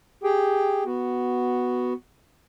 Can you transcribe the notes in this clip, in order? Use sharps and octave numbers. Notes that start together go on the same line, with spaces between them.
G4 G#4 G5
B3 F#4